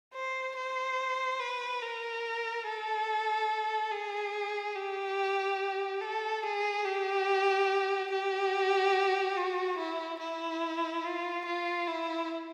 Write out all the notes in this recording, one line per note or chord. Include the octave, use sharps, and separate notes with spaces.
C5
C5
B4
A#4
A4
G#4
G4
A4
G#4
G4
G4
F#4
E4
E4
F4
F4
E4